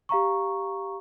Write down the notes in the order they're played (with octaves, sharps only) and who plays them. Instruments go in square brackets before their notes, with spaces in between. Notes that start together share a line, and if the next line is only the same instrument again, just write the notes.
[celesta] G4 F5 A#5 C#6